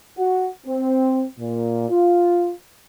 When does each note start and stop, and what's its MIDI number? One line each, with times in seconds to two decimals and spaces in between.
0.17 0.48 66
0.66 1.25 60
1.39 1.87 46
1.90 2.52 65